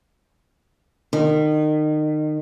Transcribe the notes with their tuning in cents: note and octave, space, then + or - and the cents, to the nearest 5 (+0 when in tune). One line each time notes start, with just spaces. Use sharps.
D#3 -30